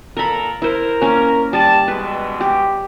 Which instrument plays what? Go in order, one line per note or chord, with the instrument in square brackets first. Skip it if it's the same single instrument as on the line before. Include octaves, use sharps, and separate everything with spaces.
[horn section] A#2 A4 A#5 [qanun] A#4 B5
[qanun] E4 C5 [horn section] A#4
[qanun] A#3 C#4
[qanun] G3 [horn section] A5
[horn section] B2 E3 G#3 [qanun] B4
[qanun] G4